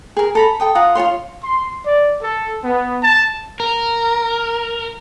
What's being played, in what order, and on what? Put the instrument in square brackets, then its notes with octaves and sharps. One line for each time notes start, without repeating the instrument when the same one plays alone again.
[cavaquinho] G#4 A#4
A4 A#5 B5
A4 G5 D#6
F4 F#5 A#5 D#6
F4 G4 C#5 C6
[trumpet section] C6
D5
A4
B3
A5
[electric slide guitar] A#4